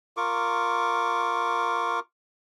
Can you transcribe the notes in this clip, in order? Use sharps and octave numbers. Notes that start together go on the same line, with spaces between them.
F4 A#4 C#6 D6